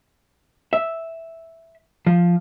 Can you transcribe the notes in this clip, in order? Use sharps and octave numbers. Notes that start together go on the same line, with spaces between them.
E5
F3